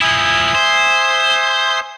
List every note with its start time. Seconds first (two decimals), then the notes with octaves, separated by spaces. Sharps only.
0.01 F3 E4 E5 G#5 D#6
0.55 C5